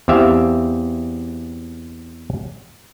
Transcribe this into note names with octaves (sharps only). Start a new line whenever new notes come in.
E2 C4 G4 E5 F5